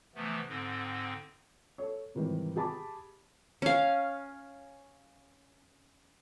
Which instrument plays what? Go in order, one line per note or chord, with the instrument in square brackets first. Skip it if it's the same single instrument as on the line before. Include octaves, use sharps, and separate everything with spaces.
[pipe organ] C3 E3 F3 A3 B3
G#2 D3 C4
[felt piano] A4 C#5
G#2 C3 D#3 E3 G3
G4 G#4 A5 B5 D6
[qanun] C#4 F5